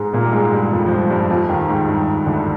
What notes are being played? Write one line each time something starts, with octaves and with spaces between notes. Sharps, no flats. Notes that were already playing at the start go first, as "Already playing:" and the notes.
Already playing: G#2 G#3
A#2 A#3
G3
G#2 G#3
G2 G3
F2 F3
F3
G2 G3
G2 G3
F2 F3
D#2 D#3
G#2
G2
D2 D3